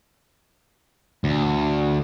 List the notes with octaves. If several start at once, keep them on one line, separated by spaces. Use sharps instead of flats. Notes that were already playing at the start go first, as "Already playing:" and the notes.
D2